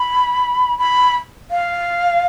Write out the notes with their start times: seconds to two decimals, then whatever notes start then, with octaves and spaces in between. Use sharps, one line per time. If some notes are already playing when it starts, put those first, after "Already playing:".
Already playing: B5
0.78 B5
1.51 F5